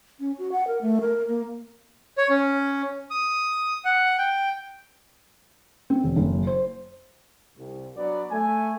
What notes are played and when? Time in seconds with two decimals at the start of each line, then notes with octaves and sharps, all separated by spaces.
0.20 C#4
0.39 F#4
0.52 F#5
0.67 A#4
0.81 A3
1.01 A#4
1.28 A#3
2.18 C#5
2.30 C#4
3.11 D#6
3.85 F#5
4.18 G5
5.90 C4
6.04 E1
6.16 F#1
6.47 C5
7.58 C2
7.96 F#3 B3 D4 F#4 D5
8.31 A3 G#5